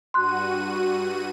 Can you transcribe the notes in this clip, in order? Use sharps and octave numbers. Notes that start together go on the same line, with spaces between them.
G2 F#4 C6 F#6 D#7